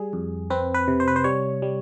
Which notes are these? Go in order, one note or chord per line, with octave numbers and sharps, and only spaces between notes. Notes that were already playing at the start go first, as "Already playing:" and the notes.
Already playing: G3 G#4
F2
C4 B4
B4
C3
C5
B4
C5
G3 C#5
G3